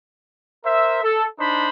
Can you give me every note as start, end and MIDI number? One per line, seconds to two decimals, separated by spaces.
0.64 0.99 70
0.64 0.99 72
0.64 0.99 76
1.03 1.25 69
1.39 1.69 62
1.39 1.69 63
1.39 1.69 72
1.39 1.69 83